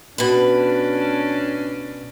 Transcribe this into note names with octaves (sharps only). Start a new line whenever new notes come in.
B2 C#4 D4 B4